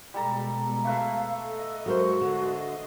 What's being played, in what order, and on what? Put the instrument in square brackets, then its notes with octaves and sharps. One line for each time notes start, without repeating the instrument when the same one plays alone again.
[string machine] B2 G#3 [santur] G3 A4 A#5
[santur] A3 B4 E5 [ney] F5
[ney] A4 [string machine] D#5
[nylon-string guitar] F#3 A#4 C5 [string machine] G#3 C#7 [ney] F#4
[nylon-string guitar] D3 [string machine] D#5 C6